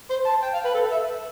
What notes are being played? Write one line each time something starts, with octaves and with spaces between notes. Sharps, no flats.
C5
A5
G5
F5
B4
A4
E5